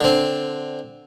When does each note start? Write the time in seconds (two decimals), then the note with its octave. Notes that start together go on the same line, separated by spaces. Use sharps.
0.01 D3 C4